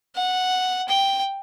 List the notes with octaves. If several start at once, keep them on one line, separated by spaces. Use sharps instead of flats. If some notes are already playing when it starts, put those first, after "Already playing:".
F#5
G5